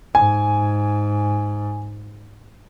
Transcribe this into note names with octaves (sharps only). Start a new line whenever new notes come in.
G#2 G#5